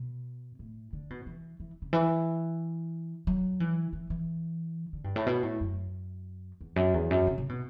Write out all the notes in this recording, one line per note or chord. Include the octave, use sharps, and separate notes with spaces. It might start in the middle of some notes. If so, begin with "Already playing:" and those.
Already playing: B2
A2
D3
B2
E3
E3
C#3
E3
F#3
E3
E3
E3
D3
G2
A2
B2
A2
F#2
E2
F#2
E2
F#2
C#3
C#3
B2